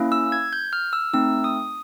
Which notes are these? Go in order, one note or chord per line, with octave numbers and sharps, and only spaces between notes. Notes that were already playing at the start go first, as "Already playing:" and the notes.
Already playing: A#3 C#4 E4
E6
G#6
G6
F6
E6
A3 C4 D#4 E6
D#6